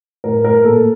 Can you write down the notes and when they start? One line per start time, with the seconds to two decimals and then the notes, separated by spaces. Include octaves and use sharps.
0.24 A2 A#4
0.44 A2 A#4
0.64 A#2 A4